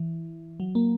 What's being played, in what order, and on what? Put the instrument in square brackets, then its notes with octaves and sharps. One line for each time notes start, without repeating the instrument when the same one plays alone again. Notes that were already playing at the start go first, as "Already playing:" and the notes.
Already playing: [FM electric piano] E3
F#3
A#3